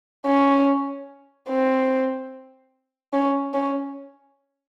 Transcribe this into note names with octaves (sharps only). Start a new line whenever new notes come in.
C#4
C4
C#4
C#4